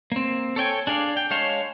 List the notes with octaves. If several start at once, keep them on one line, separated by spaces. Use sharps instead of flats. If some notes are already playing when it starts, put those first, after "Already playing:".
A#3 C4
A4 C#5 G5 G#5
D4 G#4 D5 F5
G5
G#3 C#5 F5 A5